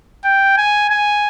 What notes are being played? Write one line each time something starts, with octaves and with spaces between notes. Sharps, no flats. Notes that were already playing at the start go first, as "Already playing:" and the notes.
G5
G#5
G#5